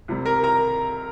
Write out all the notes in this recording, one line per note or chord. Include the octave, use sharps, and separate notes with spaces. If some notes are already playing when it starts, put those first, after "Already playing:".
C2 C3 G3
A#4 A#5
A#4 A#5